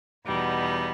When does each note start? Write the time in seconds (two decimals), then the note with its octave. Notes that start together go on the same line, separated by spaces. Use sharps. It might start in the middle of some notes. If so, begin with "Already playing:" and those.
0.24 E2 B2 G3 B3 D#4